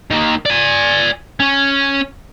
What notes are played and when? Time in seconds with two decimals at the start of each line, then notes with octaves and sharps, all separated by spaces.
0.11 D#3 A#3
0.46 D5 G#5
1.40 C#4